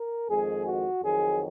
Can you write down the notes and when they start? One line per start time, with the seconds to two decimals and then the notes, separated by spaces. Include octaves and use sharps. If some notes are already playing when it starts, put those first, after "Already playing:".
Already playing: A#4
0.28 F2 D#3 G#3 G#4
0.65 F#4
1.02 F2 D#3 F#3 G#4